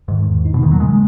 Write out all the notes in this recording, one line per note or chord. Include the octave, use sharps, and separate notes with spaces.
G#2 D#3
E2
D#4
B2
D#3 A#3
F#3
C#3 G#3